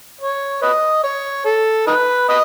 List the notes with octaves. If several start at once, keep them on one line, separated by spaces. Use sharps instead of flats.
C#5
B4 D#5
C#5
A4
D#4 B4
B4 D#5